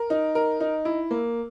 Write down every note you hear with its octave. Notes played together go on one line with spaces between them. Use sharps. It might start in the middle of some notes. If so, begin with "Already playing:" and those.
Already playing: A#4
D#4
A#4
D#4
E4
A#3